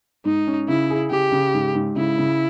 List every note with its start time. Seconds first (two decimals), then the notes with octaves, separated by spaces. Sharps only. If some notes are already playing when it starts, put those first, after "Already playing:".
0.25 G#2 D#4
0.47 C#4
0.68 C#3 E4
0.90 G#4
1.10 C#3 G4
1.32 C#3
1.54 G#2
1.75 G#2
1.96 C#3 E4
2.18 C#3